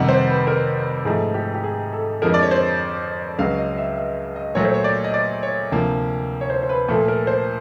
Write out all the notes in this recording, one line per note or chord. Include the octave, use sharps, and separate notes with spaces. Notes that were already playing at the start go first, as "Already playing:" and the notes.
Already playing: F2 C3 D#3 G3 F#5
C5
B4
A#4
G#2 F3 A3 G#4
G4
G4
G#4
A4
F2 D3 F3 G#3 A#4
D5
C#5
C5
C#2 C#3 F#3 F5
D#5
E5
E5
D#5
A#2 F#3 A3 C#5
C5
C#5
D5
D#5
D5
C#5
D2 C3 F3 A#3
C#5
C5
C5
B4
A#2 F3 A3 A4
A#4
C5